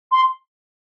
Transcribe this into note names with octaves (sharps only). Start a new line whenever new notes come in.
C6